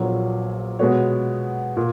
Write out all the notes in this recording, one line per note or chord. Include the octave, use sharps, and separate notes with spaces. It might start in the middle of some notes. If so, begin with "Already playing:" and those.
Already playing: A#1 A#2 F#3 B3
B2 G#3 B3 F#4 C#5
A#2